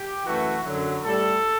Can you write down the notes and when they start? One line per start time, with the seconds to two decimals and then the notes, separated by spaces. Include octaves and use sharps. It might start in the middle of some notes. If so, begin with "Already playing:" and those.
Already playing: G4
0.25 F#2 E3 A3 F#4
0.65 F#2 D3 F#3
1.02 A2 G3 A4